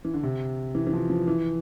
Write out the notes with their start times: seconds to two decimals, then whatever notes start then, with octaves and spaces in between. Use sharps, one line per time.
0.05 E3
0.14 D3
0.23 C3
0.75 E3
0.87 E3
0.93 F3
1.10 F3
1.27 E3